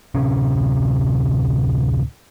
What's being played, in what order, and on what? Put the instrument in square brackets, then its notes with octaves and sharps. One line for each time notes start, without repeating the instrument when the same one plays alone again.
[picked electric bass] D1 C3 C#4